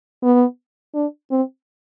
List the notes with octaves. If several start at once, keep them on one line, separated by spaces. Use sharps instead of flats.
B3
D4
C4